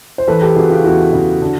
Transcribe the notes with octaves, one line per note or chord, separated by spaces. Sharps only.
C5
E3 A4 B4
G4 A4
C#3 F#4 G#4
F4 G4
E2 E4 F#4
C#3
D3